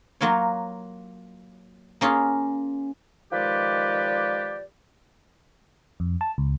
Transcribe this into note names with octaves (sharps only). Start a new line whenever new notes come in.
F#3 A#3 F4 C#5
A#3 C#4 F4 G#4
D#3 F3 G#3 G4 B4 D5
F2
A5
C#2